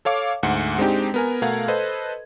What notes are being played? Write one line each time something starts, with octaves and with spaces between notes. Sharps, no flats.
A4 C#5 F5 D6
D2 G#2 F#5 C#7
G#3 C4 D4 D#4 G4
B3 A#4 G#5
B2 A3 A#4 F5 F#5 G#6
A4 B4 C5 D#5